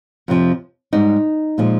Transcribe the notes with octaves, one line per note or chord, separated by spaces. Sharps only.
F2 C3 F3
G#2 G3 D#4
A#2 F3 G#3